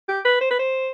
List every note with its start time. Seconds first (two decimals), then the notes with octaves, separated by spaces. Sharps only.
0.08 G4
0.25 B4
0.41 C5
0.51 B4
0.59 C5